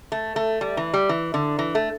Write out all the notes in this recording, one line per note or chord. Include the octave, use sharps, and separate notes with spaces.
A3
A3
G3
E3
G3
E3
D3
E3
A3